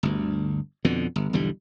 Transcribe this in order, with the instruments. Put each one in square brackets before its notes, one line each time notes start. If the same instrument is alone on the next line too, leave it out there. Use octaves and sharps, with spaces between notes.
[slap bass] G1 D2
F2 B2 D3
G1
B1 E2 D3 G3